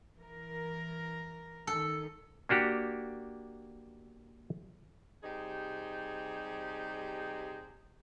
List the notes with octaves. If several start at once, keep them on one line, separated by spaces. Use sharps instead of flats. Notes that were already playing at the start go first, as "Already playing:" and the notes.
E3 A#4
D#3 A4
A#3 D4 F#4 G4
C3 G3 D#4 G4 G#4 C5